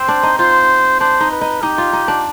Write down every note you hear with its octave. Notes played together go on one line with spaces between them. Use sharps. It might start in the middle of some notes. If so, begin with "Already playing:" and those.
Already playing: C4 C5
D4
D#4
F4 C5
D4 C5
D#4
B4
D#4
D#4 G4
F4
D#4
D4